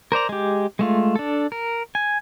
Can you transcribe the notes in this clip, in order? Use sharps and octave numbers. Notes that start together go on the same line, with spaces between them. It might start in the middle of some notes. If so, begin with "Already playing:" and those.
A#4 C5 D5 A#5
G#3 G4
G#3 A3 F4
D4 A4
A#4
G#5